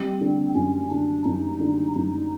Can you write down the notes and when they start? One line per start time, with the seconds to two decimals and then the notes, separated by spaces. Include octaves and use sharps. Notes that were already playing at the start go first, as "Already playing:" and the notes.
Already playing: G3 C4
0.21 D3
0.55 F#2 C#4
0.91 D3 D4
1.25 F#2 D#4
1.60 D3
1.95 F#2 D#4